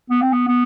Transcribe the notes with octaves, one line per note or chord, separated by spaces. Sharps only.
B3
C4
B3
B3